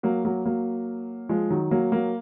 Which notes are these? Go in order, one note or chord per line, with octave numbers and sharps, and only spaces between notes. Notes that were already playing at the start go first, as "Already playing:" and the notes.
F#3 A#3
F#3 A#3
F#3 A#3
F3 G#3
D#3 F#3
F#3 A#3
F#3 A#3